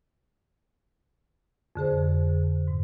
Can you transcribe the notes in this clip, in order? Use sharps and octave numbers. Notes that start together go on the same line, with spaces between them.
F2 D3 G#4 C5
G#2